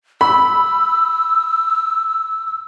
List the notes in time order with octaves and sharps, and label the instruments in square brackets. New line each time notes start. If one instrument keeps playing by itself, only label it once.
[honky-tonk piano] B5 [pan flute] E6